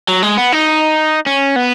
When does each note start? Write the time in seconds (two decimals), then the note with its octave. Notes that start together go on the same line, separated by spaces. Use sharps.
0.08 F#3
0.23 G#3
0.38 B3
0.52 D#4
1.26 C#4
1.56 B3